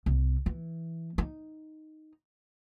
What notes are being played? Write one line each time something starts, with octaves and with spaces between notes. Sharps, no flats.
C2
E3
D#4